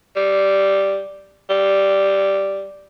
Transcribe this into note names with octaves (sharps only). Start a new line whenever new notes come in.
G3
G3